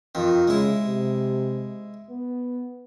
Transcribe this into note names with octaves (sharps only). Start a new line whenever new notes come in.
F2 D#3
C#3 G#3 E4
C3
B3